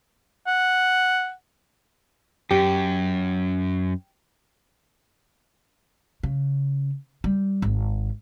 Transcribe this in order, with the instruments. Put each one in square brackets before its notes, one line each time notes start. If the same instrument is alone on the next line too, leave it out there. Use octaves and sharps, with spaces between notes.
[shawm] F#5
[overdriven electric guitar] F#2 [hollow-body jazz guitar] G4
[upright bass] C#3
G3
G#1